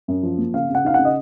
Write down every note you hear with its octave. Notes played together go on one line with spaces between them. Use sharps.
F#2
F3
A#3
C#3 F5
C#3
F#5
D#4 F5
C#3 F#5
D#5